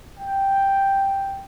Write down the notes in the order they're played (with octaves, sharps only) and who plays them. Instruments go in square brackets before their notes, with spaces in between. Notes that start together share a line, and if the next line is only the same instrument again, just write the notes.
[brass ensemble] G5